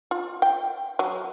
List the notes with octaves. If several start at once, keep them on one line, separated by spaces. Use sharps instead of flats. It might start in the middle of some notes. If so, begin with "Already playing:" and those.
F4
G5
F#3